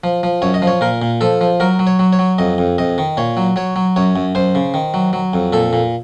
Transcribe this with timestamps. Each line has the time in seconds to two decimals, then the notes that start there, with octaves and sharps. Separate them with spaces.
0.04 F3
0.23 F3
0.42 F#2 C#5
0.54 D#5
0.62 F3
0.67 C#5
0.81 A#2 A#4
1.02 A#2
1.21 F3 A4
1.41 F3
1.60 F#3 A#4
1.79 F#3
1.87 C#5
1.99 F#3
2.13 C#5
2.19 F#3
2.38 F2 D#5
2.58 F2
2.78 F2 D#5
2.98 D#3
3.17 A#2 C#5
3.37 F#3
3.56 F#3 C#5
3.76 F#3
3.96 F#2 C#5
4.16 F#2
4.35 F#2 C5
4.55 C#3
4.74 D#3
4.94 F#3
5.13 F#3
5.33 F2
5.53 A#2 A4
5.73 A#2